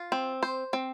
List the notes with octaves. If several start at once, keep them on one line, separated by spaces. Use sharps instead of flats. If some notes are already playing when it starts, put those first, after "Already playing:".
Already playing: F4
C4
C5
C4